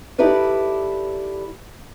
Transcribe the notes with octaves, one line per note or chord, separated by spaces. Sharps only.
D#4 E4 G4 A4 B4 D5